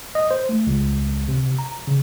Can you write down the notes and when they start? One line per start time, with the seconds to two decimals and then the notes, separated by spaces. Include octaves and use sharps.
0.15 D#5
0.31 C5
0.49 A3
0.67 C#2
1.28 C3
1.58 A#5
1.87 C#3